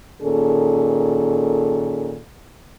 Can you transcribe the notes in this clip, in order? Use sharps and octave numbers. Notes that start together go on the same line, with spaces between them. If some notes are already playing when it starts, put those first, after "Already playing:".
A#2 D#3 C#4 G#4 A4